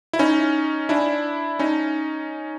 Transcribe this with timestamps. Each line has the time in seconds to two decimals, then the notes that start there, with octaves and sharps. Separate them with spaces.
0.13 E4
0.19 C#4 D#4
0.89 D4 E4
1.59 C#4 D#4